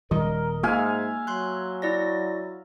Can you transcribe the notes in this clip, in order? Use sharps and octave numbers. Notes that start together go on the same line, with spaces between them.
D#1 D#3 G3 A#4 D#5
G#2 A#3 E5 F5 G#5
F#3 C6 F#6
E4 D5 A#6